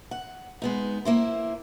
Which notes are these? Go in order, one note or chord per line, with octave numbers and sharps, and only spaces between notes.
F#5
G#3 B3 D#4
A#3 E4 C5